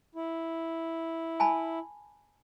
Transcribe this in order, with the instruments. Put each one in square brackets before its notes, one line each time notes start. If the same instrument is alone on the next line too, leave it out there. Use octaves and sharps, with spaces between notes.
[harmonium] E4
[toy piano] G#5 A5 B5